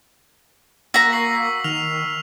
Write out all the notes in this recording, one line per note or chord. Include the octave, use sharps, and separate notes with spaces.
A#3 F#4 A#5 E6 B6
C#6 C7 F#7
D#3 F6 F7